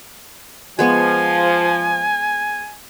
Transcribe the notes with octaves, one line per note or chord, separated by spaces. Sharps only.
F3 G#3 B3 G#5 C#6